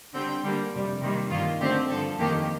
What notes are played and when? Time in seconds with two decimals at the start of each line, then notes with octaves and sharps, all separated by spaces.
0.14 D3 G3 C4 G5
0.43 D3 G3 A#3
0.73 F2 C3 G3
1.01 C3 D#3 G3 A#3
1.30 G2 D#3 A#3 F4
1.60 D3 A3 C4 G4
1.90 G2 D3 F3 A4
2.19 F2 D#3 A#3 G4